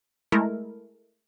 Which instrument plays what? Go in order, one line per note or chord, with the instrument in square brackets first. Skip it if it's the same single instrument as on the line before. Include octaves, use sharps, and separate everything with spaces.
[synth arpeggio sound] G#3 A3 E4 A#4